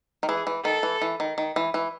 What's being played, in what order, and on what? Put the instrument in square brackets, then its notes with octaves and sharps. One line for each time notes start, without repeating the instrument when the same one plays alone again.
[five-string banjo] D#3
[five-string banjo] E3 [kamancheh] G#4
[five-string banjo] E3
[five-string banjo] D#3 [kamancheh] A4
[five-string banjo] E3
E3
D#3
D#3
E3
E3